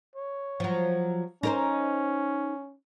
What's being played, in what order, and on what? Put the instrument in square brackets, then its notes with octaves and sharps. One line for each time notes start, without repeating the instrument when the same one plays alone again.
[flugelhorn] C#5
[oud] F3 F#3
[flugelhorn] C#4 [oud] D#4 A#4 C5